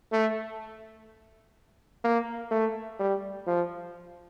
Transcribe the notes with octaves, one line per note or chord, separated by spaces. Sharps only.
A3
A#3
A3
G3
F3